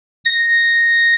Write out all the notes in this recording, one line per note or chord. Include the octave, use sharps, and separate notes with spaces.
A#6